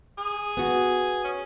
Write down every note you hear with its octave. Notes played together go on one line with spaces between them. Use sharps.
G#4
B3 F#4
C#4